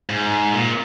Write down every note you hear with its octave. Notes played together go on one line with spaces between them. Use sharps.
G#2
A#2